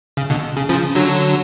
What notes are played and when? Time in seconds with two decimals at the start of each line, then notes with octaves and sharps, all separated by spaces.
0.17 C#3
0.30 B2 D3
0.57 C#3
0.69 C#3 F3
0.95 D3 F#3